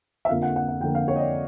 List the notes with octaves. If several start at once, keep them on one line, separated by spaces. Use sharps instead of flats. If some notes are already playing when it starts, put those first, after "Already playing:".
E5
F2 D3 F3 A#3 F5
F#5
F#5
F#5
F2 D3 F3 A#3 G5
F5
C#5
D#5
D5